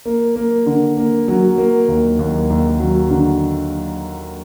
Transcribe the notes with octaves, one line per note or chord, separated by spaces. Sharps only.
A#3
A#3
D3
A#3
F#3
A#3
D#2
D#2
D#2
F#3
D3